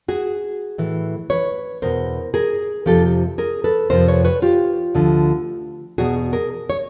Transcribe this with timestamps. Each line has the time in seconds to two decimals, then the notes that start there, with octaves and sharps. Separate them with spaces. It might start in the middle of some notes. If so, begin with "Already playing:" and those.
0.08 F#4 G#4
0.78 A2 E3
1.30 B4 C#5
1.82 E2 B2 A#4 C5
2.34 G#4 A#4
2.86 F2 C3 F3 G4 A4
3.38 G#4 A#4
3.64 A4 B4
3.90 F2 C3 F3 A#4 C5
4.08 B4 C#5
4.25 B4 C#5
4.42 F4 G4
4.95 D2 D3 F3
5.98 E2 B2 F#4 G#4
6.33 G#4 A#4
6.70 C#5